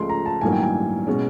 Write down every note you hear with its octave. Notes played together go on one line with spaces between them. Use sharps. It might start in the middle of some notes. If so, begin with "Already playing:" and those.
Already playing: C#2 C#3 F3 A3 C6
A#5
A5
A1 G2 D#3 F#3 A#3 G#5
G5
G#5
B2 G#3 C#4